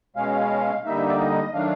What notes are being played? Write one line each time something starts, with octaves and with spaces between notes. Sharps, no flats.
B2 G#3 C#4 F5
D3 G3 A#3 D#4 E5
D5
D#5
D#3 F#3 A3 D4 F5